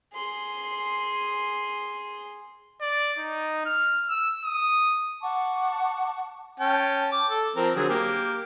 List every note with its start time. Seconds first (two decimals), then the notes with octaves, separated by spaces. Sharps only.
0.13 G#4 C6
2.81 D5
3.18 D#4
3.66 F6
4.09 E6
4.44 D#6
5.21 F#5 A5 C#6 D6
6.60 C#4 G5 A5
7.12 D6
7.31 A4
7.56 F3 C4 A#4
7.76 D3 F#3 G#4
7.89 A#3 G4